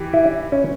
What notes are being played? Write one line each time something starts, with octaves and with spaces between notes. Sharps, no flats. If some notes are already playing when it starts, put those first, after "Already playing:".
Already playing: E3 G4
E4
C#4